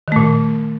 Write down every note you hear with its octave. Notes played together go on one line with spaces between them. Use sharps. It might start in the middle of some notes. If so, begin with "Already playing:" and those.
A#2 D#3 A3